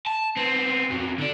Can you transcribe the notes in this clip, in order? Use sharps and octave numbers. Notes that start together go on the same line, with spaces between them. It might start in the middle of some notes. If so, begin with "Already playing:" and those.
A5
B3 C4
F2 F#3
D3 D4